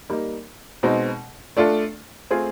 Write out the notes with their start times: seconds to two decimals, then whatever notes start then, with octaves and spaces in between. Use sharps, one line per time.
0.09 G3 A#3 D#4
0.83 B2 G#3 C4 D#4
1.57 A3 D4 F4 A4
2.31 A3 C4 F4 G#4